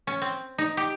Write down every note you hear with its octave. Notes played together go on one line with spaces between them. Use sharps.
C#4
C4
D#4
G4